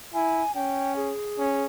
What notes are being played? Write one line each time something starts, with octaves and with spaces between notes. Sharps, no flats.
E4 G#5
C#4 G5
G#4
C#4